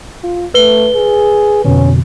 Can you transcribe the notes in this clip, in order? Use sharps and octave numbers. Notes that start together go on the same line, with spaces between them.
F4
A3 B4 G7
G#4
F2 B2 D3 C#4